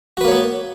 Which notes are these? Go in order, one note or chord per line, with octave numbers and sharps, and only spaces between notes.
A#3 B3 F#4 B4 C#5